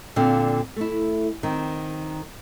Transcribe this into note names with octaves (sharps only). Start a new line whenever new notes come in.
A#2 D3 C4 F5
A3 E4
D#3 C4